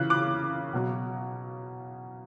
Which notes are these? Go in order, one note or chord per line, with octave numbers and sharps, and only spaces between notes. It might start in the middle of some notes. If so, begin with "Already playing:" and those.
Already playing: C#3 E3 F#6
D6 F#6
B2 F#3